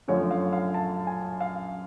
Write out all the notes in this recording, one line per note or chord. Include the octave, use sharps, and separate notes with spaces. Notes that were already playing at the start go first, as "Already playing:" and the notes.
F#2 D3 F3 A3 C#5
F5
F5
A5
G#5
F5